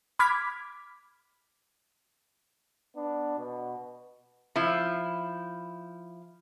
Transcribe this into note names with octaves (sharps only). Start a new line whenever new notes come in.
B5 D6 F6 G#6 B6
B3 D4
B2
F3 E4